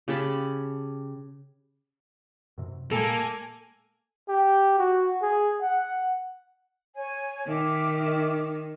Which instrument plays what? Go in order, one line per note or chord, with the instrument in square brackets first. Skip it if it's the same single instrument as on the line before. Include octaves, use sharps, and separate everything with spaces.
[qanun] C#3 G4 A5 B5
[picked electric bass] F#2 C3 E3
[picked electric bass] A#2 G#3 [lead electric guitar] A#3 [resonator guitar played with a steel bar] A4 [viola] G#5
[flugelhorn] G4
F#4
G#4
F#5
[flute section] C#5 G#5
[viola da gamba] D#3 [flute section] E5 D6